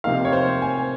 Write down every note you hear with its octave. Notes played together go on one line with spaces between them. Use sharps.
C3 F3 A#3 D#4 F5
C#5
C5
G#5